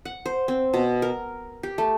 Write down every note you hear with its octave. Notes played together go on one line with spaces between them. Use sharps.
F#5
C5
C4
B2
A#4
G4
A3